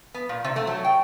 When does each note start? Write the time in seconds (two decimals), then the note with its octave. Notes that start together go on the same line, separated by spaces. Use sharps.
0.14 B3
0.29 A#2
0.44 C3
0.56 A3
0.67 F#3
0.84 G5